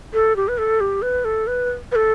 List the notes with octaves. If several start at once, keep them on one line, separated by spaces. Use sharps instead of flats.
A4
G4
B4
A4
G4
B4
A4
B4
B4
A4